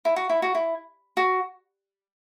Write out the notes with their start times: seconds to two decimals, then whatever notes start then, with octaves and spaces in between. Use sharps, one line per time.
0.05 E4
0.16 F#4
0.29 E4
0.42 F#4
0.55 E4
1.17 F#4